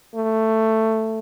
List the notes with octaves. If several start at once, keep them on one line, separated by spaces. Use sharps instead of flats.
A3